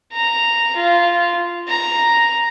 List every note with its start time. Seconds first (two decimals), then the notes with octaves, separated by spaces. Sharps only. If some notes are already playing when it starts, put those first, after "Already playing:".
0.13 A#5
0.76 F4
1.68 A#5